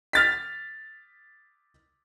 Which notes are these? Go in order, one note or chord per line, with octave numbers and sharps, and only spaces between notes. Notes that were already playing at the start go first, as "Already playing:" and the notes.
F6 A6 B6